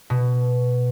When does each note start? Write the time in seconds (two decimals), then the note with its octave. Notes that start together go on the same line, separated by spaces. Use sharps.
0.10 B2